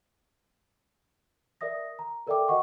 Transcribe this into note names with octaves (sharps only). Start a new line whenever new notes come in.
A#4 D5 E5 D#6 A#6
A#5
A4 A#4 D5 E5 G5 D6
F#4 A#4 D#5 F#5 C#6